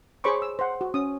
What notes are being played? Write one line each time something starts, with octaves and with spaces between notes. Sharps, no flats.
G#4 C5 C#5 B5 C#6 D6
E6
C5 F#5
F#4
C#4 D#6